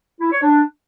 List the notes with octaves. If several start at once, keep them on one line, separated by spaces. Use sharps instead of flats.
E4
C#5
D4